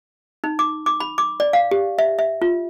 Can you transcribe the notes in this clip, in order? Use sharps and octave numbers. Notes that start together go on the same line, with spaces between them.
D#4
D6
D6
B5
D6
D5
F5
G4
E5
E5
F4